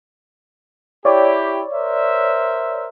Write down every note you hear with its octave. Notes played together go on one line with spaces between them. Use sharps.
E4 G4 C#5 D5
A#4 C5 E5